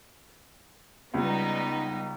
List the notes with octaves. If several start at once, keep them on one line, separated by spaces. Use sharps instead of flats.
C#2 G3 B3 D#4